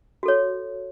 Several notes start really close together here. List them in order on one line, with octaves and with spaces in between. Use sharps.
F#4 A4 C#5